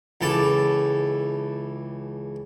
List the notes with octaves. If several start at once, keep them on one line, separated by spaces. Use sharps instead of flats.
C#2 E3 A4 A5 D6